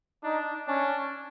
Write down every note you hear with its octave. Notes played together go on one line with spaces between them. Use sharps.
D4 D#4
C#4 D4